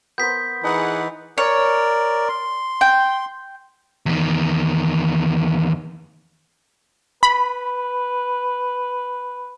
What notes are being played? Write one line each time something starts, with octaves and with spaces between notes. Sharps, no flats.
B3 A#4 C5 G6 B6
E3 D#4 G#4 F#5
A#4 C#5 D5
C6
G5
E2 D#3
B4 B5